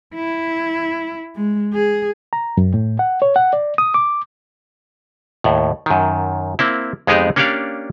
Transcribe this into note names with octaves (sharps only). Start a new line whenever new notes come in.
E4
G#3
G#4
A#5
F#2
A2
F#5
C#5
F#5
D5
D#6
D6
D#2 A2
F#2 D#3
A#3 C4 E4
F2 G#3 B3 D#4 G4 G#4
A#3 C#4 D4 G4 D5 F5